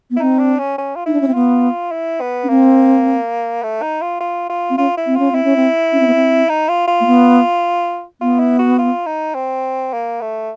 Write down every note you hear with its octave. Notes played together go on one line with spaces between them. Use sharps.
B3
E4
C4 D#4
D4
C#4
C#4
F4
D#4 E4
D4
C#4
C4
B3 F4
E4
B3
C#4
A#3 C4
A3
D#4
F4
F4
F4
C4
C#4 F4
E4
C4
C#4 F4
C4 E4
C#4
C4
C#4
C4
B3
C4
D#4
F4
F4
A#3
B3
B3 F4
E4
F#4
F4
D#4
C4
A#3
A3